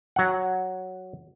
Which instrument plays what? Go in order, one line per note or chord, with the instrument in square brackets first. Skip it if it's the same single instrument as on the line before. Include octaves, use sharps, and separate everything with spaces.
[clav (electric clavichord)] F#3 F#5